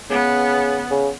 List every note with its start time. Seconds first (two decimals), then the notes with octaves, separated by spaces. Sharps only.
0.10 C#3 B3
0.91 C#3